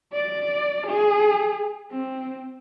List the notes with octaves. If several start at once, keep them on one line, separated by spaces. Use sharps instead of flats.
D5
G#4
C4